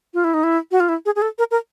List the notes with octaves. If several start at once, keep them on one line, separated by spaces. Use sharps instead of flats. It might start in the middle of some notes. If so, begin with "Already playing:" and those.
F4
E4
D#4
E4
F#4
F4
E4
G#4
G#4
A4
A#4
A#4